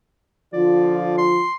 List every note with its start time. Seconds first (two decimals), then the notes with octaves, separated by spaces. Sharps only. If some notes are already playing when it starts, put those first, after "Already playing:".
0.53 D3 F3 F4 D5
1.18 C6